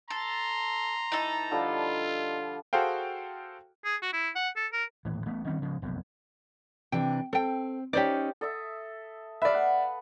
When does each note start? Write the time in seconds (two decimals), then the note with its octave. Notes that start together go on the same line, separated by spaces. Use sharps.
0.10 A4 A#5 C6
1.12 E3 D#4 A4
1.51 D3 F3 G3 F4
2.73 F#4 G#4 A4 C5 F5 G5
3.85 G#4
4.02 F#4
4.13 E4
4.35 F#5
4.56 A4
4.73 A#4
5.05 D#1 A2 E3
5.26 A1 A3 B3
5.47 D#3 G3 C4 C#4
5.62 C#3 F3 G#3
5.82 F1 B1 F#2
6.92 C3 E3 D4 G5
7.33 C4 A4 G5
7.93 C#4 D#4 G4 C5 D5
8.41 A4 D#5 E5
9.42 B4 D5 E5 F5
9.54 F#5